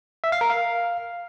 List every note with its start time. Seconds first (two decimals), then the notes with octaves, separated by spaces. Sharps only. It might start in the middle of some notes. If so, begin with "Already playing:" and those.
0.24 E5
0.32 F5
0.41 A#4
0.50 F5